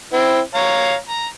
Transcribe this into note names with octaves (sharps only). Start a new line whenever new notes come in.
C4 E4
C#5 F5 A#5
A#5